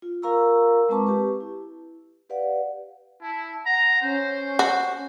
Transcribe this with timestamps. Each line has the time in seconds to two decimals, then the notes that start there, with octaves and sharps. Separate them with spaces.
0.02 F4
0.22 F4 A#4 F5 A#5 C#6 E6
0.89 G#3 C4 B4 A5 C#6 D6
1.07 G4 B4
1.40 E4
2.29 G4 B4 D5 F5 F#5
3.22 E4 A5
3.66 F#5 A#5
4.02 C#4 C5
4.59 F#4